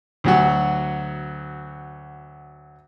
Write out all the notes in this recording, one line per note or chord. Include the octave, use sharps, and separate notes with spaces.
D2 F#3 F#4